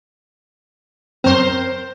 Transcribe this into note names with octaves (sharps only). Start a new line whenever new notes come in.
F#2 C4 A#4 C5